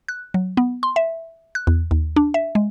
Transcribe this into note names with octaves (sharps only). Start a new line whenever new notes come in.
F#6
F#3
B3
C6
E5
F#6
E2
D#2
D4
E5
G#3